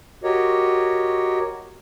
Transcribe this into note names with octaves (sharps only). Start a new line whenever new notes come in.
F#4 G4 A#4 C#5 D#5